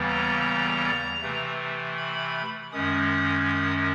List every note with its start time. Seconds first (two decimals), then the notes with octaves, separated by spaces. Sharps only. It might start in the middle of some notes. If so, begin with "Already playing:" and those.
Already playing: D#2 C#3 E3 G3 B3
0.08 A#5
1.22 C3 E3 A3
1.97 B5
2.73 F#2 D#3 G#3 C#4 D#6
3.11 D#6
3.48 D#6